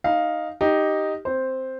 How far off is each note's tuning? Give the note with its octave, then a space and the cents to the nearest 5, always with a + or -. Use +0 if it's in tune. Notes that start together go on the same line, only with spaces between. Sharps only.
D#4 +0 F5 +0
D#4 +0 G4 +0
C4 +0 C5 +0